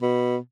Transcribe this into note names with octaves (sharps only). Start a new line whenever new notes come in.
B2